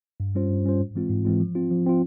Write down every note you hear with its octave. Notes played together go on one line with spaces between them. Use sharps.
G2
G3 C#4 F4 C5
G2
G3 C#4 F4 C5
G#2
E3 G#3 C4 F4
G#2
E3 G#3 C4 F4
F3
C4 F4
F3
C4 F4